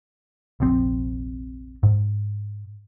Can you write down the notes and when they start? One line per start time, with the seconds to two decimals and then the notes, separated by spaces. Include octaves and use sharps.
0.60 F1 A#1 F2 C4
1.83 G#2